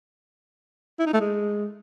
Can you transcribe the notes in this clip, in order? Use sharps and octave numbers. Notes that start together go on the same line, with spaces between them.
E4
D#4
A3
G#3